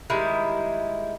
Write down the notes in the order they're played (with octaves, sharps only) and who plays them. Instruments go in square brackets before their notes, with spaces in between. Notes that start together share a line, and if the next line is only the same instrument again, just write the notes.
[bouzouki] D#3 G3 G#3 E4